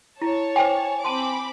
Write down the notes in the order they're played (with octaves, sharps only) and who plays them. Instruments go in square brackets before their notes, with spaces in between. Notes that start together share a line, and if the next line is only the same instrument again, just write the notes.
[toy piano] E4 [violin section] C#5 A5
[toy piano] C5 G5 [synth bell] G#5
[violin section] C4 B5 D6 [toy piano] A5 C6